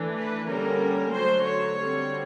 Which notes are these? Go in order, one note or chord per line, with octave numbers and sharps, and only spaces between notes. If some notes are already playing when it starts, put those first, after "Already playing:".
Already playing: E3 A3 D4
B4
D3 G3 A#3 C#4 A#4
D3 F#3 A3 C5
C#5
D3 G3 C4